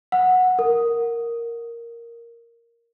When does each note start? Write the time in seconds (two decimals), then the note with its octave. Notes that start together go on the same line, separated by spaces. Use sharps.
0.12 F#5
0.59 A#4